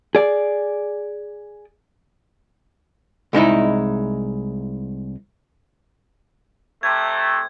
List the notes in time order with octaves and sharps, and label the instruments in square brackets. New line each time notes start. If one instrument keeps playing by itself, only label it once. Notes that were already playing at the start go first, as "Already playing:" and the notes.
[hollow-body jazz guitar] G#4 D5
C2 G#3 D#4 E4
[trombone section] C3 A3 [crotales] G#6